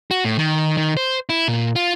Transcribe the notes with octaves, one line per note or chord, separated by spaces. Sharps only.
F#4
A2
D#3
D#3
C5
E4
A#2
F4